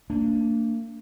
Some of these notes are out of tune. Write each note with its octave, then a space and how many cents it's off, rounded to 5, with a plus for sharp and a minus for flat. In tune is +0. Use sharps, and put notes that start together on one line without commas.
A#3 -40 D4 -15